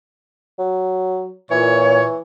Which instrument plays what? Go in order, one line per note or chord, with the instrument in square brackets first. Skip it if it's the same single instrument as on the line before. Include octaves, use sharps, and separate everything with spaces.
[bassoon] F#3
[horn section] A#2 C#5 [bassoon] E3